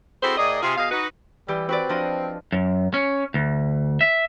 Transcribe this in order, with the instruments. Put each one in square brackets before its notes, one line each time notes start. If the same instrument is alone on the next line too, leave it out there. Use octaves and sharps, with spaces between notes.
[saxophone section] C4 E4 F#4 G#4 A4 C5
A2 G#4 A#4 D5 D#5
C3 F4 G#4
B2 G#4 D#5 F5
D#4 F#4 B4
[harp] E3 G4 [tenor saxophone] G3
[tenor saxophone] C4 [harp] F#4 B4 D5
[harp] F3 D4 D#5
[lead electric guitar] F#2
C#4
D2
E5